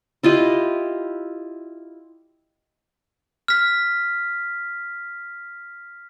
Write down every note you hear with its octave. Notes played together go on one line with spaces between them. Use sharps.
E4 F4 G4 D#5
F6 B6